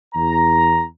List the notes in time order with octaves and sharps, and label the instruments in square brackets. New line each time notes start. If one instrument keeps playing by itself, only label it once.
[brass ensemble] E2 A#5